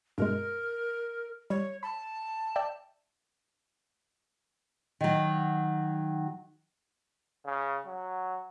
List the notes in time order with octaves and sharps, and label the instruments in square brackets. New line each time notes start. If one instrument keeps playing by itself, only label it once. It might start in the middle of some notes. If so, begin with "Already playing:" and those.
[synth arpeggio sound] G2 B2 G#3 [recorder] A#4
[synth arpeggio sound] G3 [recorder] C#5
[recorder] A5 [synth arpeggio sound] B5
[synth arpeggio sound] D5 E5 G5
[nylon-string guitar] D#3 F#3
[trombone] C#3
F#3